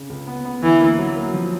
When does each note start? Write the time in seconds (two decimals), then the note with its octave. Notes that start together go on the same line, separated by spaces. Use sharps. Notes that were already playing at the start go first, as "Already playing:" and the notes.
Already playing: C#3
0.10 C#2
0.27 B3
0.45 B3
0.63 D2 E3
0.80 A#3
0.99 F#3
1.16 A#3
1.34 F3